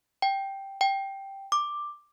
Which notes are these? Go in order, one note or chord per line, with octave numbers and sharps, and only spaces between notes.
G5
G5
D6